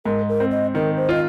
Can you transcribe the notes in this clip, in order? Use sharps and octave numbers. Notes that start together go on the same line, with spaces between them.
G#2 A#4
A#4
C4
D#5
D#3 A#4
C5
F4 D#5